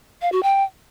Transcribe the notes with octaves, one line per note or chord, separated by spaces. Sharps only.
F5
F#4
G5